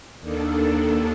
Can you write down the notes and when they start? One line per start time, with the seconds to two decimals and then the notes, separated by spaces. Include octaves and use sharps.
0.20 D#2 D#3 A#3 D4 A4